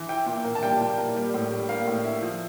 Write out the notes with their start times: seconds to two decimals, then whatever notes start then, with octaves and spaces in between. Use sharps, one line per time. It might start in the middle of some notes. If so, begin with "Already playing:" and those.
Already playing: E3
0.09 E4 G5
0.26 A#2
0.45 A#3
0.55 A5
0.63 G3 G5
0.80 A#2
0.98 A#3
1.16 G3
1.34 A2
1.51 G3
1.69 A#3 F5
1.87 A2
2.04 E4
2.23 F3